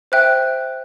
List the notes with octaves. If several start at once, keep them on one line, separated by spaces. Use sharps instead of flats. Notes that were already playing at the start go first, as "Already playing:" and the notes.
C5 E5 G5 F#6